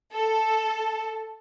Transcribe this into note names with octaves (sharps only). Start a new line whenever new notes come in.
A4